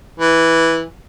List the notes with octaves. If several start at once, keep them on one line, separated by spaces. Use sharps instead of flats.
E3